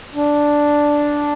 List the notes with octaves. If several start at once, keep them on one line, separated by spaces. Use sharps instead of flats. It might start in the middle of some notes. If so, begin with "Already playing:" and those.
D4